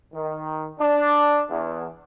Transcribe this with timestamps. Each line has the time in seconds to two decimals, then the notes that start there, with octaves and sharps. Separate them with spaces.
0.14 D#3
0.80 D4
1.49 E2